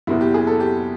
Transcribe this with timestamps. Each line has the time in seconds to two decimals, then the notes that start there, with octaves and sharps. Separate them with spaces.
0.07 F#1 E2 B2 E4
0.21 G4
0.34 G#4
0.47 A4
0.60 G4